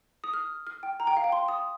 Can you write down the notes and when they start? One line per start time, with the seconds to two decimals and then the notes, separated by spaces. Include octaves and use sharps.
0.24 D#6
0.34 F6
0.67 F6
0.83 G5
1.00 A#5
1.07 G5
1.17 F5
1.24 G5
1.32 C6
1.48 D#6